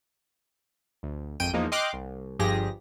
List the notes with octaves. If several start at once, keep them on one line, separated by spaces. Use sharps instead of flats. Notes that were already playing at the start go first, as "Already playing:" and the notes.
D2
G#1 F2 G5 D7 D#7
E2 F3 G#3 A#3 D#4
D#5 G5 C6 D6 F6 F#6
C2
G1 G2 F3 G4 G#4 A#6